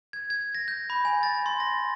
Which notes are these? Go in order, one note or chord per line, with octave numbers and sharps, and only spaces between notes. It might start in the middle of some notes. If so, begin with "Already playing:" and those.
G#6
G#6
A#6
G6
B5
G#5
A6
C6
A#6